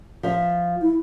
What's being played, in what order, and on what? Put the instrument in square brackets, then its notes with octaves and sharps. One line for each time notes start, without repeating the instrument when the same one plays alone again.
[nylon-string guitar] F3 E5
[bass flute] E4